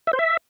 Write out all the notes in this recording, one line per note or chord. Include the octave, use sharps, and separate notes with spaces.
E5
C5
E5